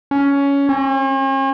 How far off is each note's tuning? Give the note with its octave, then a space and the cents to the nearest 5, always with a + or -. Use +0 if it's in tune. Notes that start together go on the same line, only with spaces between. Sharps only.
C#4 +15
C#4 -45